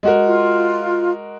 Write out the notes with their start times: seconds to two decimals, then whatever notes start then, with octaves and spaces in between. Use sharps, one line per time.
0.03 G#3 F#4 A#4
0.27 F4